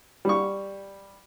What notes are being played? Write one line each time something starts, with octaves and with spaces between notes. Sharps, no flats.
G3 C#6